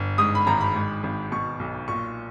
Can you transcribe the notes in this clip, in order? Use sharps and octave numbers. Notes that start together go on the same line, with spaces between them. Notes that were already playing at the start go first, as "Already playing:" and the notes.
Already playing: G1
G#2 D#6
B5
G#1 A#5
B5
G#2
G#1
B2 C#6
B1
A#2 C#6